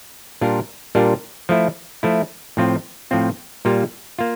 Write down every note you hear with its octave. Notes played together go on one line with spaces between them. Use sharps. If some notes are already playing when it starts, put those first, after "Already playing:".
A#2 G3 D4 F4 A#4
A#2 G3 D4 F4 A#4
F3 A3 E4
F3 A3 E4
A2 F3 C4 F4
A2 F3 C4 F4
A#2 G3 A#3 F4
A#3 F4